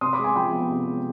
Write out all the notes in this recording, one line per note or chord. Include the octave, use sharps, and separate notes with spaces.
C3 C6 D#6
B5 D6
G#3
G#5 C6
F3 G5 B5
B3
C3
G#3